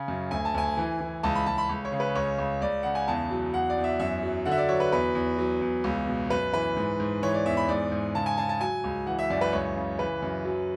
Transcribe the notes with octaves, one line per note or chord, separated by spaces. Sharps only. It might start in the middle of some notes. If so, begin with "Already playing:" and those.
Already playing: C#3
F#2
D2 G#5
A5
D2 G#5
E3
E3
C#2 A5
B5
C#2 A5
B5
C#2
C#5
C#3
B4
C#2 C#5
C#2
C#2 D5
C#3 F#5
G#5
E2 A5
F#3
E2 F#5
D5
E2
E5
F#2 E5
F#3
D3 F#5
E5
D5
F#3 C#5
B4
E2 B4
E2
F#3
E2
C#2
B2
F#2 B4
E3 B4
G#2
G#2
E3 C#5
D5
E2 E5
B5
G#2 D5
G#2
C#3 A5
G#5
C#3 A5
A5
F#3 G#5
C#2
E3 F#5
E5
F#2 D5
B4
C#2 C#5
C#3
E3 B4
F#2
F#3